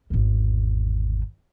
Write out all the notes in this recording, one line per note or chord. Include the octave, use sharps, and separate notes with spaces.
G#1 E2